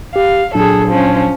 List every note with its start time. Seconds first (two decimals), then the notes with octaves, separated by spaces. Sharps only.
0.16 G4 F5
0.55 A#2 F#3 D4 G#4 A4
0.89 F3 C#4